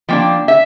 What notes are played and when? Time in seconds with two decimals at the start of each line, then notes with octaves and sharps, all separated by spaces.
0.09 F3 A#3 D4 G5
0.48 E5